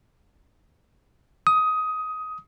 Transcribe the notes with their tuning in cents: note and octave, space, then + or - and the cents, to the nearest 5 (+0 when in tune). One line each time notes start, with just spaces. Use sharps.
D#6 +15